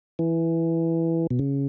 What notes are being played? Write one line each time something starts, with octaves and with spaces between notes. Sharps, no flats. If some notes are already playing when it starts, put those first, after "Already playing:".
E3
B2
C#3